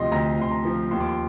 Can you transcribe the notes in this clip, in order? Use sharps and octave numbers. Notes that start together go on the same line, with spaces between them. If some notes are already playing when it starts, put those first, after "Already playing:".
Already playing: D2 C3 F3 D#5 C6
D2 A#5
D2 C6
A#5
F3
D#2 C6
D6
C6